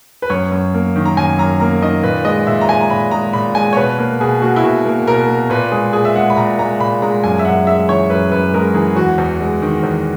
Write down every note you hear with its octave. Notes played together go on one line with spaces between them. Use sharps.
B4
F#2 C#5
F#2
A#3
D#3
A#5
F#2 G#5
F#2 A#5
A#3 A#5
D#3 D#5
A#2 B4
G#3 D#5
A#2 E5
A#5
G#3 G#5
A#5
A#2 B5
G#3 A#5
A#2 B5
G#3 G#5
C#5
B2 B4
A#3
B2 G#4
A#3 F#4
E4
B2 F#4
A#3
B2 A#4
A#3
A#2 B4
G#3 G#4
A#2 G#4
E5
G#3 F#5
B5
A#2 A#5
G#3 A#5
A#2 B5
G#3 A#5
F#2 G#5
E5
F#2 F#5
G#3 E5
E3 C#5
F#2 B4
F#2 B4
G#3 A#4
E3 G#4
E2 F#4
E2
G#3
D#3
E2